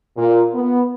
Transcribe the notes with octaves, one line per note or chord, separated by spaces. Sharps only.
A#2
B3